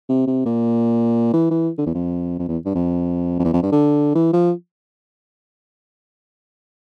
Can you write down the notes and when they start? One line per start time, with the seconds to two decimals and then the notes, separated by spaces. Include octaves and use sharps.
0.09 C3
0.27 C3
0.45 A#2
1.33 E3
1.51 E3
1.78 D3
1.86 E2
1.94 F2
2.39 F2
2.48 E2
2.65 G2
2.75 F2
3.39 F2
3.44 E2
3.53 F2
3.63 G2
3.72 D3
4.15 E3
4.33 F3